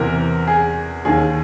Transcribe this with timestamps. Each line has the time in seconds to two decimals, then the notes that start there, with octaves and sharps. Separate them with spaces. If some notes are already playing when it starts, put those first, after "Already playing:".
Already playing: E2 C3 E3 A#4
0.47 G#4
1.05 D#2 D#3 G#4